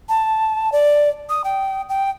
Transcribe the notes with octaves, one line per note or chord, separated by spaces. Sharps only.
A5
D5
D#6
G5
G5